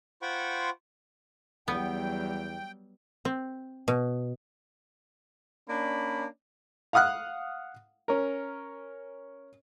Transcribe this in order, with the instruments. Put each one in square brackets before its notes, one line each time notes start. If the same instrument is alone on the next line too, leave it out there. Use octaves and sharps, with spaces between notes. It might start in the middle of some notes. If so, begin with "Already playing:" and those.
[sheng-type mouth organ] F4 C5 F#5 G5 B5 C#6
[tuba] E2 [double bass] F#3 G3 [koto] B3 [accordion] G5
[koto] C4
B2
[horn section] A#3 C#4 D4 D5 B5
[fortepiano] F5 F#5 D#6 F6 F#6
C#4 A#4